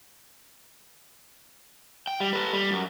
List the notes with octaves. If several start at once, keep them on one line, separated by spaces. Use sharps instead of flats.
G5
G3
A4 B4
G3
F#2